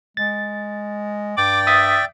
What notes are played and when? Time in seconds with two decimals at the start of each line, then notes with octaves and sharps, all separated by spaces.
0.17 G#3 A6
1.38 G2 D5 G5 D6
1.67 E5 D#6 A6 B6